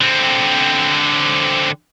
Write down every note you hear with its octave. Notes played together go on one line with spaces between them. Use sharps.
D3 C4